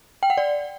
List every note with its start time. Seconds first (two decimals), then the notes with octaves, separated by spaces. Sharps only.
0.23 G5
0.30 F#5
0.38 D5